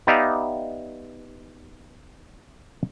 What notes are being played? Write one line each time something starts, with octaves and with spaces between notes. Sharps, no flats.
B3 D#4 G4 D5 E5 F5